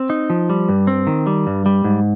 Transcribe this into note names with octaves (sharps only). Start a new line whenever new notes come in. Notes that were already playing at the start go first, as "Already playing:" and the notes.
Already playing: C4
D#4
F3
G3
G2
C4
D#3
G3
G2
G3
G#2